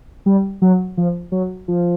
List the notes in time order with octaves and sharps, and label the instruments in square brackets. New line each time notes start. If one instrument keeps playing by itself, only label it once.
[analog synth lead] G3
F#3
F3
F#3
F3